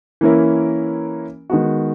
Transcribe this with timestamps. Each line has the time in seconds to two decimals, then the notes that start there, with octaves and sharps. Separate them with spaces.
0.21 E3 A#3 C#4 E4 A#4
1.50 D#3 G#3 B3 F#4